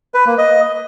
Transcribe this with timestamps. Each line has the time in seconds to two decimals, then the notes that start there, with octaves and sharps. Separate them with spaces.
0.14 B4
0.26 A#3
0.38 D#5